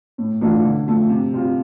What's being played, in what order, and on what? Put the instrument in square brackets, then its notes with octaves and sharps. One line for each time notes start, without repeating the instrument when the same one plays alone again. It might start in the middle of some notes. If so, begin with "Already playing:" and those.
[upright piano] A2
E3 A3 D4 F4
D3
F3 A3
C3
G3 C4 F4